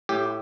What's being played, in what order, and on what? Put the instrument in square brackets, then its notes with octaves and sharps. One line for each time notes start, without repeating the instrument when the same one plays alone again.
[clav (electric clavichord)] A2 G4